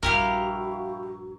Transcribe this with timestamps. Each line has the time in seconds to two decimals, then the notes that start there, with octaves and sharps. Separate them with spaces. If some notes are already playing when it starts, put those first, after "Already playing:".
0.03 A#1 G2 E4 F#4 G4 A#4 F5